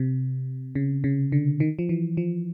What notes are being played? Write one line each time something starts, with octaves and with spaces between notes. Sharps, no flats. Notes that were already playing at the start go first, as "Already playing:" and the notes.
Already playing: C3
C#3
C#3
D3
D#3
F3
E3
F3